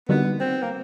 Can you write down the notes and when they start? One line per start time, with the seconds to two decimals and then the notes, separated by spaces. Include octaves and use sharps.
0.09 D3 G3 A#3 B3 D#4 F#4
0.40 C4
0.63 A#3